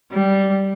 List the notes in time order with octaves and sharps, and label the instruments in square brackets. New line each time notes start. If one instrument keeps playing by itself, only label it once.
[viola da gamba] G3